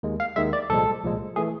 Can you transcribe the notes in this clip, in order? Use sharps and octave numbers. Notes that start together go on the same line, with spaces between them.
D#2 D#3 G#3
F5
D#2 D#3 G#3 E5
D5
C2 A#2 F3 G#3 A4
C2 A#2 F3 G#3
E3 A3 G#4